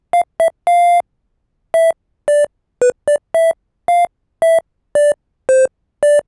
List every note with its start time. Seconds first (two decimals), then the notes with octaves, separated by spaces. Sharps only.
0.13 F5
0.40 E5
0.67 F5
1.74 E5
2.28 D5
2.82 B4
3.08 D5
3.34 E5
3.88 F5
4.42 E5
4.95 D5
5.49 C5
6.03 D5